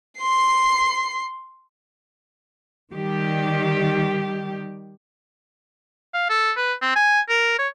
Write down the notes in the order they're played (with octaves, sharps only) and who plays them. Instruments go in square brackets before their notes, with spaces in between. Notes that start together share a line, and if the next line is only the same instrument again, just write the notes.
[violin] C6 C7
[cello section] D#3 G3 G4
[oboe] F5
A4
B4
C4
G#5
A#4
C#5